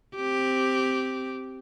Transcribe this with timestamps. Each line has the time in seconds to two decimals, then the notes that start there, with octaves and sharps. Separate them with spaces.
0.15 C4 G4